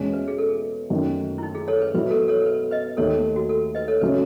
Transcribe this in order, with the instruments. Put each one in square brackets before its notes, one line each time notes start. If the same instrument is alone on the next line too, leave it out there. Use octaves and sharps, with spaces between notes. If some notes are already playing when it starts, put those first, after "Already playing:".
Already playing: [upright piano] E2 B2 G#3 C#4
[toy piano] B4
G#4
A4
[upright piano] F#2 D#3 A3
[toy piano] E4
D#4
G#4
A4 C#5
B4
[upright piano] B2 F#3 B3 E4 [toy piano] B4
[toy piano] A4
A4 C#5
A4
B4
B4 D#5
[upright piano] D#2 D#3 A3 [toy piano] A4 C#5
[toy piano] A4
F#4
A4
B4 D#5
A4 C#5
[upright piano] C#3 F#3 A3 C#4 [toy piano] B4